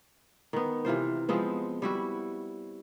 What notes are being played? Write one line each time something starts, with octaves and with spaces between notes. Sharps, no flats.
D#3 B3
C3 E3 F4 C5
F3 G#3 B3 C4
G3 E4 F#4